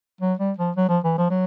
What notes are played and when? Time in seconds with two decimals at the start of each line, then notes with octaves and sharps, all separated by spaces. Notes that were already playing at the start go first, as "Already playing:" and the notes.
0.21 F#3
0.39 G3
0.58 F3
0.77 F#3
0.89 F3
1.04 E3
1.18 F3
1.31 F#3